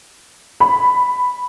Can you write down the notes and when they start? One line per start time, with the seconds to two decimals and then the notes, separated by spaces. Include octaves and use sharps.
0.60 B5